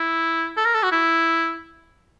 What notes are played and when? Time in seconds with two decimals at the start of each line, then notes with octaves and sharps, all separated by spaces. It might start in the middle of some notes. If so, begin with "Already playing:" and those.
Already playing: E4
0.57 A4
0.65 A#4
0.74 A4
0.83 F#4
0.92 E4